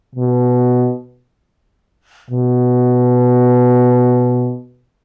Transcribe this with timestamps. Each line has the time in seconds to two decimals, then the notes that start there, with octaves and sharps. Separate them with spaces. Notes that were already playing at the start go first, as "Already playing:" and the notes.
0.15 B2
2.30 B2